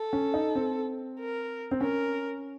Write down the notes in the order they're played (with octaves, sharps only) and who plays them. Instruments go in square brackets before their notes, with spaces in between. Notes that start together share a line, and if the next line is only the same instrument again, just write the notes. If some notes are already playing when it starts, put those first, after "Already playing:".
Already playing: [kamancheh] A4
[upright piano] C#4
D#4
C4
[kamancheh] A#4
[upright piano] C4
[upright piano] C#4 [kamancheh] A#4